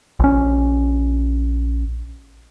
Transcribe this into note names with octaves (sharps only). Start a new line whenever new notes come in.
A#1 C#4